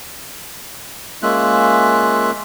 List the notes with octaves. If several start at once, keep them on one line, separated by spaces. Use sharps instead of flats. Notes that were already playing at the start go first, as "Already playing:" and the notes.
G#3 A#3 C#4 F4 E5 F#6